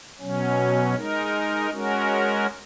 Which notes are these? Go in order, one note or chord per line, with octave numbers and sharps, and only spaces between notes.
B2 F#3 C#4
G#3 D#4 A#4
G#3 C#4 F#4 A#4